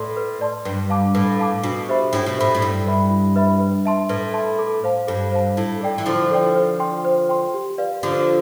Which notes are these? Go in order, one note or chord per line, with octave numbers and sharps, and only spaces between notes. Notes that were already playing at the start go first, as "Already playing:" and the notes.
Already playing: A2 B4 D5 A5 C6
B4
D5 A5 C6
G2 B4
F5 A5 D6
A2 B4
F5 A5 D6
B2 D4
G4 C5 E5 B5
A2 D4
B2
A2 G4 C5 E5 B5
A2
G2 E4
B4 E5 B5
E4
B4 E5 B5
B4
E5 A5 C6
A2 B4
E5 A5 C6
A4
C5 F5 A5
G2 A4
C5 F5 A5
A2 E4
A4 D5 G5
E3
D3 F3 E4
A4 D5 G5
C5
G5 C6
C5
G5 C6
G4
B4 D5 F5
D3 F3 G4